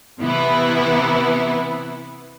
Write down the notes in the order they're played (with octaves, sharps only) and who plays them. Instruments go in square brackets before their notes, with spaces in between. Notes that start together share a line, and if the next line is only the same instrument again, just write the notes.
[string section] C3 E3 B3 E4